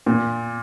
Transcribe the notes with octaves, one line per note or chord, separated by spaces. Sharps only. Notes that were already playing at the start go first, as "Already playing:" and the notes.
A#2